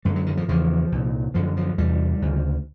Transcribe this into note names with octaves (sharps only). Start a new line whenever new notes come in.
F#2 D3 G3
F#3
D#3
F3
E2 C#3 F3
C2 A#2
F#2 D3 F3
F3
E2 C3 G3
D2 C#3